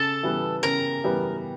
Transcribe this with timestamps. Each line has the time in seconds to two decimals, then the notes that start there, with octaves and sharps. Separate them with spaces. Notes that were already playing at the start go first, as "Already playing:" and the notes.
Already playing: C#3 A4 A5
0.23 E3 G3 B3
0.63 C#3 A#4 A#5
1.04 E3 G3 B3